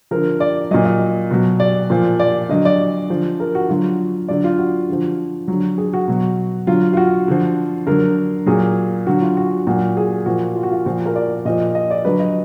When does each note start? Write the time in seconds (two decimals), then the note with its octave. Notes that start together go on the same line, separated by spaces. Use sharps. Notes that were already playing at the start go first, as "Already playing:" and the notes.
0.11 D3 F3 A#4
0.40 D5
0.71 A#2 F#3 D#5
0.85 D#5
1.31 B2 F#3
1.60 D5
1.90 A#2 F3
2.20 D5
2.49 D3 F#3 D#5
2.65 D5
3.10 D3 F3
3.40 A#4
3.55 F#4
3.69 D3 F#3 F4
4.28 D3 F#3 D5
4.44 F4
4.58 F#4
4.89 D3 F3
5.48 D3 F#3
5.78 G#4
5.94 F#4
6.08 B2 F#3
6.67 D3 F#3 F4
6.93 F4
6.97 F#4
7.28 D3 F3
7.87 D3 F#3 A#4
8.46 A#2 F#3 G#4
9.07 D3 F#3 F#4
9.22 F4
9.37 F#4
9.67 A#2 F#3 F#4
9.97 G#4
10.26 A#2 F3 F#4
10.55 F4
10.63 F#4
10.71 F4
10.86 A#2 F3 F#4
11.06 A#4
11.15 D5
11.45 A#2 F3 D#5
11.75 D#5
11.90 D5
12.05 D3 F#3 B4
12.20 D#5